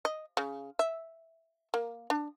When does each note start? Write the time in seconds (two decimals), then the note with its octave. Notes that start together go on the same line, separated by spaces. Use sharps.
0.05 D#5
0.37 C#3
0.79 E5
1.74 A#3
2.10 D4